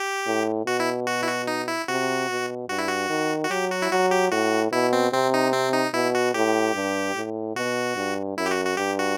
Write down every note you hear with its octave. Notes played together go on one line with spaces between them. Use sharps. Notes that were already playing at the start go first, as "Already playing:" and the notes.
Already playing: G4
A2
B2 F#4
E4
F#4
E4
F#4
D#4
E4
C3 F#4
B2
G2 F#4
E4
F#4
D#3
F#4
F#3 G4
F#4
E4
F#3 F#4
G4
A2 F#4
B2 E4
C4
C3 C4
D#4
C4
D#4
B2 E4
F#4
A2 G4
G2
A2
B2 F#4
G2
F#2 E4
G4
F#4
F#4
G2 G4
F#4